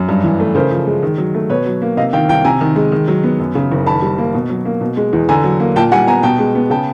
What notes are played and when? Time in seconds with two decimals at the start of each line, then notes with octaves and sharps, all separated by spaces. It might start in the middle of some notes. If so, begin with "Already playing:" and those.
Already playing: F#2
0.09 G2
0.24 E3
0.40 A3
0.55 C#3 A#4 C5
0.71 F3
0.87 G#3
1.03 D#3
1.18 F#3
1.35 A3
1.50 B2 B4 C#5
1.66 F#3
1.82 A#3
1.97 C3 D#5 F5
2.13 D#3 F5 G5
2.29 C2 F5 G5
2.45 C3 G#5 A#5
2.61 D#3
2.76 G#3
2.92 D#3
3.08 F#3
3.23 B3
3.39 F#2
3.55 C#3
3.71 F#1
3.86 D#3 A5 B5
4.02 G3
4.18 A#3
4.34 B2
4.50 F#3
4.65 A#3
4.81 B2
4.97 G#3
5.13 E2
5.29 D3 G#5 A#5
5.44 F#3
5.60 A#3
5.76 A#2 G5 A5
5.92 G3 F#5 G#5
6.07 B3 G#5 A#5
6.23 B2 G5 A5
6.39 G#3
6.55 B3
6.70 C#3 G5 A5